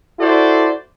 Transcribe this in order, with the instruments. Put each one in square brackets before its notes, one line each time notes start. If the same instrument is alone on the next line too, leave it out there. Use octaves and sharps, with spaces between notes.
[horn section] E4 F#4 A4 C5 D5